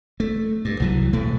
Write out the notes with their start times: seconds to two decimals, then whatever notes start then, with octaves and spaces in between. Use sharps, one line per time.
0.20 A3
0.65 G2
0.80 C2 E3 F#3
1.13 E1 A2 A3